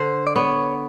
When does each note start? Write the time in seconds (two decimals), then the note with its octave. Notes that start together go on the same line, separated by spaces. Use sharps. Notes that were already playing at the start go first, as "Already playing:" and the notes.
Already playing: D3 C5
0.27 D5
0.36 B3 C#5